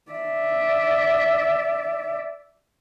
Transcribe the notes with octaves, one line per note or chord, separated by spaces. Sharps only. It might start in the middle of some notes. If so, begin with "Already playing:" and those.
D5 E5